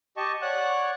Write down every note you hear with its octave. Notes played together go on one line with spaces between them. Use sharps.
G4 D#5 A5 C#6
C#5 D5 F#5 F#6